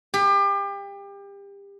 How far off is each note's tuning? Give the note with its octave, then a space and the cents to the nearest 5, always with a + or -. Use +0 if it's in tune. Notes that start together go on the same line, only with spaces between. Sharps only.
G4 +30